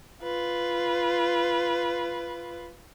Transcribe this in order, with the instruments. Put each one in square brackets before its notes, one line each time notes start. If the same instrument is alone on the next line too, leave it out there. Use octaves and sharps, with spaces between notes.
[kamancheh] F4 B4